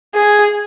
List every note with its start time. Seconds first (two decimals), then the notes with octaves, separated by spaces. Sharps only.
0.15 G#4